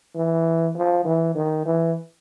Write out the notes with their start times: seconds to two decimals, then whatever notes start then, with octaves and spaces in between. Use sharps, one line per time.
0.16 E3
0.76 F3
1.05 E3
1.35 D#3
1.66 E3